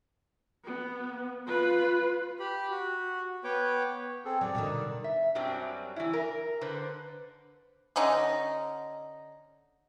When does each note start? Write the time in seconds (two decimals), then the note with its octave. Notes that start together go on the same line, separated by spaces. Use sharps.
0.65 B3
1.46 F4 B4
2.40 G4 B5
2.70 F#4
3.44 B3 B4 C#5 G5 D6
4.25 C4 G#4 A4
4.41 F#3 D5
4.55 B2 D3 D#3
5.04 E5
5.35 F#2 F#3 G3 C4 D4
5.96 E3 E4
6.13 A#4
6.61 D3 B4 C5
7.96 D3 C#4 D#4